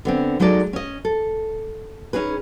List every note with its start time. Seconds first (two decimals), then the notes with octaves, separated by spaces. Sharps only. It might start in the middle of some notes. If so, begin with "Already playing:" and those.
0.05 D3 B3 C4
0.40 F#3 G#3 D#4 A4 D5
0.73 C#4 D#5
1.05 A4
2.13 C#4 D#4 G#4 B4